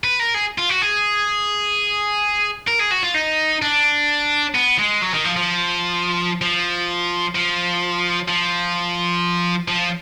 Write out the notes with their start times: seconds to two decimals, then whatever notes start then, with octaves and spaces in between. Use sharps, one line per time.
0.04 B4
0.20 A#4
0.34 G#4
0.58 F4
0.70 F#4
0.82 G#4
2.68 A#4
2.80 G#4
2.91 F#4
3.03 F4
3.15 D#4
3.62 D4
4.54 B3
4.78 G#3
5.02 F#3
5.13 D#3
5.24 F3
5.36 F3
6.42 F3
7.35 F3
8.28 F3
9.68 F3